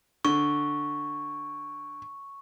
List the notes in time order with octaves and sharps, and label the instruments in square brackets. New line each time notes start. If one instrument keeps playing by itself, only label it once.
[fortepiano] D3 [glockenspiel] C#6